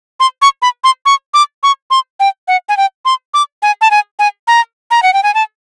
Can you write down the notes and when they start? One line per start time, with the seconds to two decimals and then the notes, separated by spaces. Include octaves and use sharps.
0.20 C6
0.42 C#6
0.62 B5
0.84 C6
1.06 C#6
1.34 D6
1.63 C#6
1.91 C6
2.20 G5
2.48 F#5
2.69 G#5
2.77 G5
3.05 C6
3.34 D6
3.62 G#5
3.81 A5
3.91 G#5
4.19 G#5
4.48 A#5
4.91 A#5
5.03 F#5
5.13 G5
5.23 G#5
5.34 A5